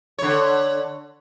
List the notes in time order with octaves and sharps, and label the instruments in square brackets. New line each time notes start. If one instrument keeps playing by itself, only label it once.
[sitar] D3 C#5